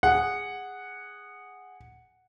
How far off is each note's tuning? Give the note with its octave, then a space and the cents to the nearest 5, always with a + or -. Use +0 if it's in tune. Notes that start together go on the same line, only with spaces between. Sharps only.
G#4 -15 F#5 +0